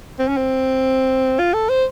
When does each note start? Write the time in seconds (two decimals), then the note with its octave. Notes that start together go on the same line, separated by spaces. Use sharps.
0.19 C4
0.28 C#4
0.37 C4
1.39 F4
1.54 A4
1.69 C5